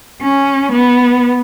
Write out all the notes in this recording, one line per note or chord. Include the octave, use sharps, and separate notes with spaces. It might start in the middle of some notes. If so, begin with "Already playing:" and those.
C#4
B3